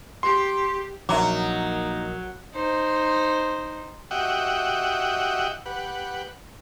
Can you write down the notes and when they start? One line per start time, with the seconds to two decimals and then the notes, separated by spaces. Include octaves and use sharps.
0.23 G4 C6
1.09 A#1 F#3 A#3 D#4 A#4 E5 A#5 D6
2.54 D#4 C5
4.11 F#4 G4 D#5 E5 F#5 G5
5.66 G4 B4 F#5